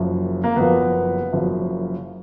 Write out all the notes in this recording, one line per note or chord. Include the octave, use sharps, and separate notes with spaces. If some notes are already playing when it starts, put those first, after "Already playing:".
Already playing: F#1 F#2 F3
A#3
F#1 F#2 F3 B3
F#1 F#2 F3